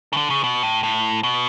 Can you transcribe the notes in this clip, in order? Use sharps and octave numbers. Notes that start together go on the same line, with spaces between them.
C#3
D3
C#3
B2
A2
A2
B2